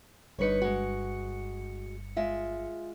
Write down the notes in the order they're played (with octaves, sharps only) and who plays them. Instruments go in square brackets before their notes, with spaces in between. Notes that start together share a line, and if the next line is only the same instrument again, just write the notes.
[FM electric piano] G1 G2 C#7 [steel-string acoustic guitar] D#4 B4 C#5
[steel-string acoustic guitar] G#3 F#4
G#3 F4 E5